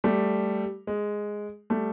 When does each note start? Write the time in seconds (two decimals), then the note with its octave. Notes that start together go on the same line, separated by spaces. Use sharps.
0.04 G3 A3
0.87 G#3
1.70 G3 A3